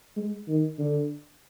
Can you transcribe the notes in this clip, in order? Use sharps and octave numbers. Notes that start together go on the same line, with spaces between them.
G#3
D#3
D3